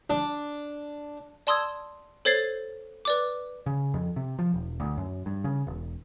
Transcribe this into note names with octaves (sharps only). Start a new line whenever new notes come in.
D4
D5 A5 C6 D#6 E6 G#6
A4 C5 C#5 G#6 A6 C7
B4 D5 D6
C#3
F2
C3
F3
E1
D2
F#2
G2
C#3
E1